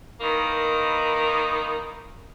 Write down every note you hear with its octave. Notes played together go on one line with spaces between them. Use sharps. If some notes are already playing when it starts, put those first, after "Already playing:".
D#3 E3 A#3